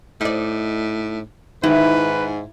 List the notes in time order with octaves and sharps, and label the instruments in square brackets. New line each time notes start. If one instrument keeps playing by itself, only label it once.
[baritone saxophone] A2 [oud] D#4 D5
[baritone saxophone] G#2 [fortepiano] D#3 [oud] E4 [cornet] B4